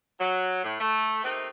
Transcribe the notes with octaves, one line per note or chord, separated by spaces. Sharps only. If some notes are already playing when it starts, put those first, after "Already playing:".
F#3
A2
A3
C3 A3 A#3 C4 D#4